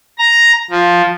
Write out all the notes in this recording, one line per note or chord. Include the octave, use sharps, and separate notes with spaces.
A#5
F3